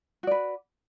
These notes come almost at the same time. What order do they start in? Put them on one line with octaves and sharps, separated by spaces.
F#4 D5 B4